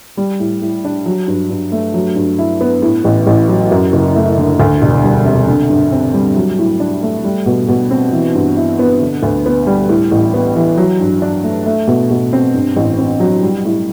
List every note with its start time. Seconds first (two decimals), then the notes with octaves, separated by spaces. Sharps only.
0.17 G3
0.40 A2
0.62 A2
0.84 D4
1.06 F#3
1.28 G2
1.50 G2
1.72 A3
1.94 F#3
2.16 G2
2.38 E4
2.61 B3
2.82 A2
3.05 A1
3.27 A1
3.49 F#3
3.71 F#2
3.93 F#1
4.16 A3
4.38 D3
4.60 D2
4.82 E1
5.03 G3
5.25 C3
5.47 D3
5.70 G2
5.92 C4
6.14 G3
6.36 F#3
6.59 A2
6.80 D4
7.03 A3
7.24 G3
7.46 B2
7.69 B2
7.91 C4
8.12 E3
8.34 G2
8.57 E4
8.79 B3
9.02 D3
9.23 D2
9.46 B3
9.67 G3
9.89 A2
10.11 A1
10.34 B3
10.56 E3
10.78 F#3
11.00 G2
11.22 D4
11.44 A3
11.66 A3
11.88 B2
12.10 B2
12.33 C4
12.54 G2
12.76 A1
12.98 C4
13.20 F#3
13.43 G3
13.65 A2